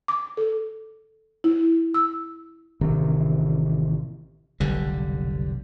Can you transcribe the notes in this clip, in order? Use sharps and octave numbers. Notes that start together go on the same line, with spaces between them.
D6
A4
E4
E6
A1 C3 D#3
F1 B1 D3 G3